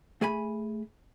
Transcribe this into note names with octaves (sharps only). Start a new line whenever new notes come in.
A3 G#4 G#5 B5